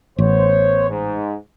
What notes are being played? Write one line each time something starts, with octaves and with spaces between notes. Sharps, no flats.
A1 B3 C5 C#5
G#2